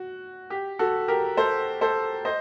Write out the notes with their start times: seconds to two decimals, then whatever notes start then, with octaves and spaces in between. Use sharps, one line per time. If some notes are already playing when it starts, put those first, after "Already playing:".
Already playing: F#4
0.50 G4
0.79 F#4 A4
1.08 G4 A#4
1.37 A4 C5
1.81 A4 C5
2.25 C5 D#5